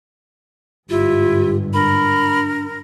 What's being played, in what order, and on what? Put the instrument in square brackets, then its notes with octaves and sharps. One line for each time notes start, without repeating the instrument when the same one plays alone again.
[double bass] G1 G#2 [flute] E4 [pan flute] F4 [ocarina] G4
[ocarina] D4 [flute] A#4 [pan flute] B5